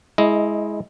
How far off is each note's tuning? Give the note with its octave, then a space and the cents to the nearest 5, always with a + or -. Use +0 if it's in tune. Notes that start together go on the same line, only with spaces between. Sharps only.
G#3 +15 E4 -15 D#5 +0